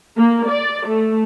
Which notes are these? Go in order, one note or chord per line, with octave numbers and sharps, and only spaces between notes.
A#3
D5
A3